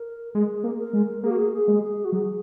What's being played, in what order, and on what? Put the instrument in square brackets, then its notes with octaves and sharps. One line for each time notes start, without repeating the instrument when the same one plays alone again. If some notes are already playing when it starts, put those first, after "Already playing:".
Already playing: [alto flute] A#4
[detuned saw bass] G#3 [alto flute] G#4
[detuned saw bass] A#3
[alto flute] A#4
[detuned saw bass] G#3
[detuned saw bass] A#3 [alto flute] G#4
[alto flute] F#4
G#4
G#4
[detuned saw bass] G#3
[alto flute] G#4
F#4
[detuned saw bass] F#3 [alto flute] G#4